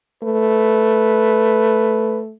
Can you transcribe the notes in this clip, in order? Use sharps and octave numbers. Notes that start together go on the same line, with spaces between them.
A3 B4